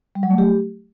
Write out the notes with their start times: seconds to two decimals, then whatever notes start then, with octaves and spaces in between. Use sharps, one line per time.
0.15 G3
0.23 F#3
0.31 A3
0.38 G4